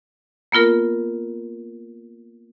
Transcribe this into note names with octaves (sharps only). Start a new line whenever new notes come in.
A#3 B3 F4 A#4